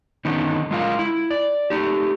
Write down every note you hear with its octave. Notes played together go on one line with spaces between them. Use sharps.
D3 D#3 B3 C#4 D#4
G#3 F4 A#4 F5
E4
D5
A3 D#4 G4